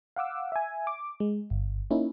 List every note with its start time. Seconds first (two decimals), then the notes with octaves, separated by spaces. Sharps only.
0.16 F5 F#5 D6 E6
0.52 E5 G#5
0.87 D6
1.20 G#3
1.50 G1
1.91 A#3 C#4 D#4 E4